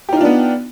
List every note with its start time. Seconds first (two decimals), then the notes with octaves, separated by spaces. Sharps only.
0.09 G4
0.13 D#4
0.17 F4
0.21 D4
0.25 B3